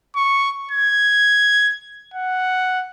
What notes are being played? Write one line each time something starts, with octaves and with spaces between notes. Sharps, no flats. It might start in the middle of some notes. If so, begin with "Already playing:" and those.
C#6
G#6
F#5